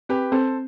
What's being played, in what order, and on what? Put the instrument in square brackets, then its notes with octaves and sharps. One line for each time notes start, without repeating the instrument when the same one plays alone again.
[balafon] C4 [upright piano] G4 B4
[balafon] C4 [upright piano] A4 C5